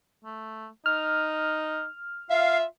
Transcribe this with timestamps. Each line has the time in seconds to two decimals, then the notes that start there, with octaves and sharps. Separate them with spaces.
0.25 A3
0.86 D#4 F6
2.31 F4 E5 F5